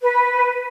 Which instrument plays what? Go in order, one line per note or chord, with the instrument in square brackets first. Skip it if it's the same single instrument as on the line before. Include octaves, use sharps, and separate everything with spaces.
[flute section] B4